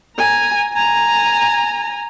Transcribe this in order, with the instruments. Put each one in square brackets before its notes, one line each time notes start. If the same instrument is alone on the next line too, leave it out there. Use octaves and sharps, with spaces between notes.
[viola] G#5 A#5
G#5 A#5